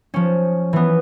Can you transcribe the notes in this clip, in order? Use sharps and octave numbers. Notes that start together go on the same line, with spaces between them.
F3 C#4
E3 B3